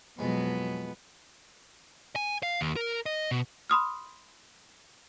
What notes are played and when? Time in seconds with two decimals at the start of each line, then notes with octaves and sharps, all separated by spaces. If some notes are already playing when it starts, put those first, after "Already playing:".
0.19 F2 B2 F#3 G#3 B3
2.16 G#5
2.43 F5
2.61 D#2
2.76 A#4
3.06 D#5
3.31 B2
3.70 B5 C6 D#6 F6